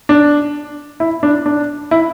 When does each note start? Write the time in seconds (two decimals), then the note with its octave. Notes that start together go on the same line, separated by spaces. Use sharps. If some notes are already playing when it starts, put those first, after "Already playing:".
0.09 D4
1.00 E4
1.23 D4
1.46 D4
1.91 E4